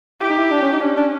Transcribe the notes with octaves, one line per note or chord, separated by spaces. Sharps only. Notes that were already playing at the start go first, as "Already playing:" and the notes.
E4 G4
D#4
E4
D4
C#4
D#4
C#4 D4
D4